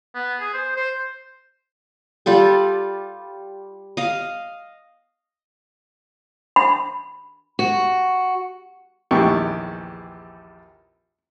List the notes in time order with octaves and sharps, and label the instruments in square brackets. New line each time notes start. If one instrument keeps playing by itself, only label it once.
[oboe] B3
G#4
C5
C5
[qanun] G3 F4 G4 A4
D#5 F5
[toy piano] B5
[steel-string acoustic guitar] F#4
[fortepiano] A#1 E2 D#3 B3 G4 C#6